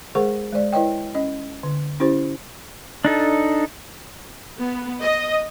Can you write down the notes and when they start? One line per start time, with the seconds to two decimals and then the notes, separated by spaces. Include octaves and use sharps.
0.15 G#3 G#4 A#4 C5 F#5 C#6
0.53 G#3 C5 D5
0.73 E4 B4 C#5 D#5 G5
1.15 C#4 D#5
1.63 D3
2.00 C#4 E4 G4 C5
3.05 D4 D#4 A4
4.58 B3
5.02 D#5